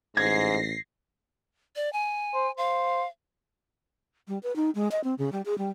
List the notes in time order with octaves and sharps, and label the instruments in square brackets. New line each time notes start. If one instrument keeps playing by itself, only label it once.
[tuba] A1 [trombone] G#2 [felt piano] G#6 [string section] A#6 C7
[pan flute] D5
G#5
[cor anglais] C5
[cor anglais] C5 [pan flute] F5
[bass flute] G3
B4
D#4
G#3
D#5
C4
C#3
G3
G#4
G3